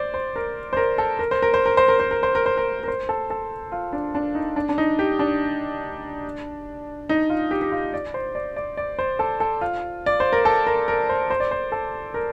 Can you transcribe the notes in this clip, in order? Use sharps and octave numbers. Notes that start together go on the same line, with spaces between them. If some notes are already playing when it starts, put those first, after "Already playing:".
Already playing: C5 D5
C5
A#4
C5
A#4
A4
A#4
C5
A#4
C5
A#4
C5
A#4
C5
A#4
C5
A#4
C5
A#4
A#4
C5
A4
A4
F4
D4
D4
D#4
D4
D4
D#4
G4
D4
D#4
F4
G4
G4
F4
D5
C5
D5
D5
D5
C5
A4
A4
F4
D5
C5
A#4
A4
A#4
A#4
C5
C5
D5
C5
A4
A#4